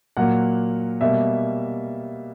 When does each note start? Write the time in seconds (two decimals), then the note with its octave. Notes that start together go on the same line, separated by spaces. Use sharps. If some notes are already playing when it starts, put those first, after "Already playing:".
0.17 A#2 F#3 A#3 F#5
1.01 B2 G3 A#3 E5